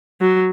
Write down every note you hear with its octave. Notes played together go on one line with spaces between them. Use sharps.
F#3